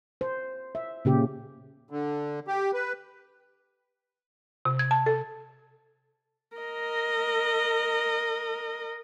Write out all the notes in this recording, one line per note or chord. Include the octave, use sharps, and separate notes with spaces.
C5
E5
A#2 C#3 G4
D3
G4
B4
C3
G#6
A5
A4
A#4 D#5